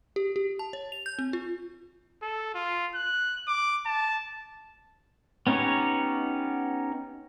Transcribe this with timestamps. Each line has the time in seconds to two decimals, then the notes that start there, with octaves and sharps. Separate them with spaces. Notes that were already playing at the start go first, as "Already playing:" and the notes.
0.16 G4
0.36 G4
0.59 A5
0.73 C#5
0.92 F7
1.06 G6
1.19 C4
1.33 F4
2.23 A4
2.55 F4
2.95 F#6
3.47 D6
3.86 A5
5.47 B3 C#4 D#4 G4 C#5